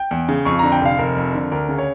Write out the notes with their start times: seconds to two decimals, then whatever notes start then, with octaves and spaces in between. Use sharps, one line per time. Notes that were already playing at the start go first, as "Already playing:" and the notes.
Already playing: G5
0.11 E2
0.29 C#3
0.45 F2 C#6
0.59 D3 A#5
0.72 G5
0.81 F1 F5
0.99 F1 A#4
1.17 F2
1.34 D3
1.52 D2 A#4
1.69 C#3
1.78 C#5